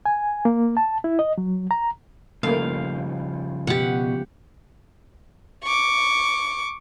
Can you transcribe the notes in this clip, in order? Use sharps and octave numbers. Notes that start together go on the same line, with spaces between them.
G#5
A#3
A5
E4
D#5
F#3
A#5
C#3 F3 G3 A3 A#3 F5
B2 G4 F#5
C#6 D6